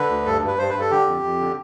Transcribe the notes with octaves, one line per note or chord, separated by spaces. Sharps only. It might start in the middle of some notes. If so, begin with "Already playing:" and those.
Already playing: D3 B4
D2
G2 A4
G2 B4
G2 C5
B4
G2
A4
D3 G4
F2
F2
D3